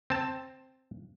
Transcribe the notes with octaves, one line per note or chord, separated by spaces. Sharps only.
C4 A5